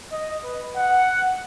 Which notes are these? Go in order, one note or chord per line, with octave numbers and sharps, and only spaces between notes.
D#5
B4
F#5